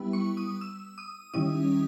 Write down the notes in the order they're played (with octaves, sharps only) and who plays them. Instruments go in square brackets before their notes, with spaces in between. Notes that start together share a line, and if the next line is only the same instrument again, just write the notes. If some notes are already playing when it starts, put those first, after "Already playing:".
Already playing: [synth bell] G3 B3 E4
C#6
D#6
E6
D#6
D#3 G3 C#4 E4 D#6